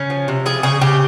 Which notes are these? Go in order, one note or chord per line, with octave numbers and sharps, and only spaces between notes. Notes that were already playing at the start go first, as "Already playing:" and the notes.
Already playing: C#3 C#4
F3
C3
F3 G#4
C#3 G#4
C#3 G4